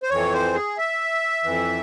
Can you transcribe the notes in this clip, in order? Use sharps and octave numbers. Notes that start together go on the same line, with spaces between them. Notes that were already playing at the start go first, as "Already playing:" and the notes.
C5
F2 E3 C#5
C5
G#4
E5
F2 E3